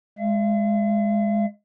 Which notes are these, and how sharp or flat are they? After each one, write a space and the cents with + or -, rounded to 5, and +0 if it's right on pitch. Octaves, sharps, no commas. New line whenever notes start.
G#3 +0 F5 -45